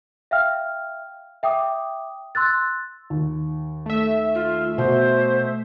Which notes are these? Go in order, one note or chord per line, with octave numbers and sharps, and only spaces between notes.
E5 F5 G5 F6
E5 G5 D6 D#6
C6 E6 F#6 A6
D#2
A3 E5
F4
B2 C5